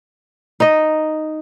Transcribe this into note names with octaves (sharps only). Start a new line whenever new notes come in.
D#4 D#5